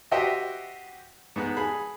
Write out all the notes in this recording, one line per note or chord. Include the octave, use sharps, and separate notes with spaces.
F#4 G4 C5 D#5 E5 G5
G#2 B3
G#4 B5